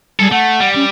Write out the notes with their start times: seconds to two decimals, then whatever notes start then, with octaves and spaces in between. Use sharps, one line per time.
0.20 G3 G#4 A4
0.32 A3 F#5
0.60 G3
0.75 C#4